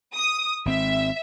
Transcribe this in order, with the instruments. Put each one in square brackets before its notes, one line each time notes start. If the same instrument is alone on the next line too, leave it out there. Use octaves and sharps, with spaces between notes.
[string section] D#6
[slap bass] G#1 C4 [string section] E5